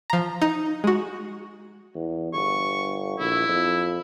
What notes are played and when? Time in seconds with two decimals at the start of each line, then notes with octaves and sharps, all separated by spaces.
0.10 F3 A#5
0.42 D#4
0.84 G#3 F#4
1.95 E2
2.33 G1 C#6
3.19 A#1 E4
3.48 F2